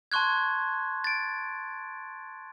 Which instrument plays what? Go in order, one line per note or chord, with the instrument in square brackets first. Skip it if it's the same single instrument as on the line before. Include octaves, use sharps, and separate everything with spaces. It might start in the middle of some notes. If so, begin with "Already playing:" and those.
[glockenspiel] A5 C6 C#6 F#6 G#6
A6 D7